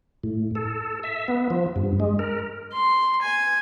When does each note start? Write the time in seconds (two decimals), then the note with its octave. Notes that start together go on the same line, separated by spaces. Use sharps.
0.24 A2
0.55 A4
1.03 E5
1.28 B3
1.50 F3
1.76 G2
2.00 G#3
2.19 A#4
2.73 C6
3.22 G#5